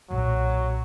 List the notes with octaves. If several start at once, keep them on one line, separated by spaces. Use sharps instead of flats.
B1 A#2 F#3